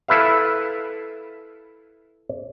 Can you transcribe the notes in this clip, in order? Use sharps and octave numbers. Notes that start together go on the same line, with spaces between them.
E4 A4 B4 E5 F5